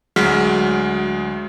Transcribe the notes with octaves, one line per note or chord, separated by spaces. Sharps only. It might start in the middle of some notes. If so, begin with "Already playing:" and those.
D2 F#3 G#3 F6 B6